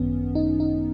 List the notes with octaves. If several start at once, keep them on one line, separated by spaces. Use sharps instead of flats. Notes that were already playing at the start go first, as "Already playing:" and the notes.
Already playing: G#1 F#2 D#3 B3 C#4
D#4
D#4